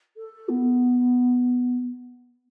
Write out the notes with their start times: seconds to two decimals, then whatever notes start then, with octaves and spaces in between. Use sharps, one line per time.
0.17 A4
0.49 B3